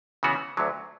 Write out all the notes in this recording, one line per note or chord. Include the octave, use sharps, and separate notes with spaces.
C#3 E3 B3 F#4 C#5
D2 D3 F#3